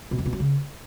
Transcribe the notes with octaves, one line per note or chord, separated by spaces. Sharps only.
B2
F#2
B2
F#3
C#3